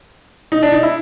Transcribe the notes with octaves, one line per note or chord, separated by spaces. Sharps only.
D#4
D4
D#4
E4